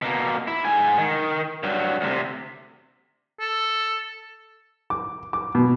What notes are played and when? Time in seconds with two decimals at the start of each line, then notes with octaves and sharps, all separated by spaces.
0.02 B2 A#3
0.48 E4
0.65 G#2 G#5
0.98 D#3
1.63 G2 F#3
2.01 D2 C3
3.40 A4
4.90 D6
5.33 D6
5.55 B2